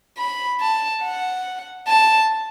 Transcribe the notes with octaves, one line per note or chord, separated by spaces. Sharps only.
B5
A5
F#5
A5